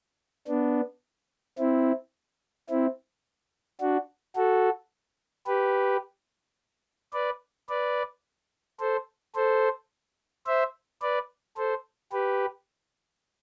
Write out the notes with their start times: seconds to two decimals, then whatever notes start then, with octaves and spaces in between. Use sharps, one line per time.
0.47 B3 D4
1.58 C4 E4
2.70 C4 E4
3.80 D4 F#4
4.36 F#4 A4
5.47 G4 B4
7.13 B4 D5
7.69 B4 D5
8.80 A4 C5
9.35 A4 C5
10.47 C5 E5
11.02 B4 D5
11.57 A4 C5
12.13 G4 B4